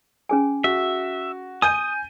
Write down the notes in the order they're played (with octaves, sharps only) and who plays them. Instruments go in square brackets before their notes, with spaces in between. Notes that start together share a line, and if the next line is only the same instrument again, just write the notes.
[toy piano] C#4 G#4 G#5
[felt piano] F#4 [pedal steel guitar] E5
[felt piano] G#5 G6 D#7 [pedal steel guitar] D#6